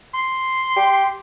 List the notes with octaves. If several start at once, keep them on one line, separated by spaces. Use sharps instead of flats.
C6
G4